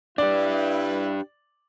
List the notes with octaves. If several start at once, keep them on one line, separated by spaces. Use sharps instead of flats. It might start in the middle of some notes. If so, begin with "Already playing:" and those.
D4 E4 G4 B4 D5